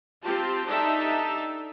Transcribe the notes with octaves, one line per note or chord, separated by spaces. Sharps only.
C4 F4 G4 A5
D4 D#4 G4 A4 E5 A5